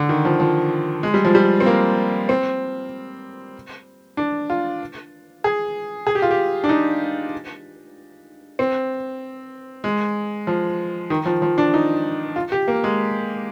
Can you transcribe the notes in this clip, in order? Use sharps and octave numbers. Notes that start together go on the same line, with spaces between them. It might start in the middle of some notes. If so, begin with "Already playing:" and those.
Already playing: D3
D#3
F3
F3
G#3
G3
F3
G3
C4
A#3
C4
D4
F4
G#4
G#4
G4
F4
G4
D4
D#4
C4
G#3
F3
D#3
F3
F3
D4
D#4
F4
G4
A#3
G#3